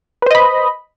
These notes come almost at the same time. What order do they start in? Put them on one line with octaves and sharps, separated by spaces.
B4 C5 D#5 B5